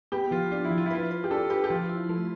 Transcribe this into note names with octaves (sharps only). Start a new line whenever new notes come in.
B3 G4
F3 F4
D4 F4
E4
F3
F4
E4
F4 B4
B4
G4
D4 A4
G4 B4
G4
F3 F4
E4
A3